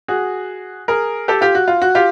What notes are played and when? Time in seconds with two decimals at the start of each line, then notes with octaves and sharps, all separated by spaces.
0.08 F#4 G#4
0.88 G#4 A#4
1.28 G4 A4
1.41 F4 G4
1.55 F#4
1.68 F4
1.82 F#4
1.95 F4 G4